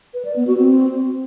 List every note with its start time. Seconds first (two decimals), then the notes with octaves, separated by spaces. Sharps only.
0.14 B4
0.25 D5
0.36 B3
0.47 F#4
0.58 C4